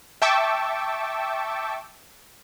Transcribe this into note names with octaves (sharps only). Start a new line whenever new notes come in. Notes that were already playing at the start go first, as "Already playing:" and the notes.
E5 G5 A5 C#6 D6 E6